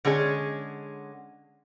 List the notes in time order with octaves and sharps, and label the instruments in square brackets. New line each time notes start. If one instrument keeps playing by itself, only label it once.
[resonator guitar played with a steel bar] D3 G#3 C#4 G#4